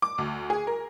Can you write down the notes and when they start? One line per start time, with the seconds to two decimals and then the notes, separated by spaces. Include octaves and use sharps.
0.02 D6
0.18 D2
0.50 G#4
0.67 A#4